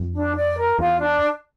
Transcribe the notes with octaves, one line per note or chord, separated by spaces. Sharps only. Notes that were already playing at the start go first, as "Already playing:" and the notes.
Already playing: F2
D4
D5
A#4
E2 F4
D4